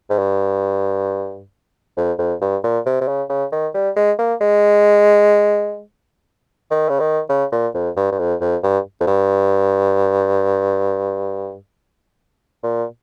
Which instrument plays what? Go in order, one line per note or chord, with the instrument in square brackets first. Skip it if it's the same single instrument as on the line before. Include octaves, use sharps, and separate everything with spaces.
[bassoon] G#2
G2
F2
F2
G2
A#2
C3
C3
C#3
C#3
D#3
G3
G#3
A#3
G#3
D#3
C#3
D#3
C#3
A#2
F2
G2
G2
F2
F2
G2
F2
G2
A#2